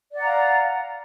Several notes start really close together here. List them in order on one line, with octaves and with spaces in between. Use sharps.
D5 F#5 A#5 F5